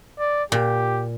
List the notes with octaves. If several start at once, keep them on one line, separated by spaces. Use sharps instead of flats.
D5
A#2 G4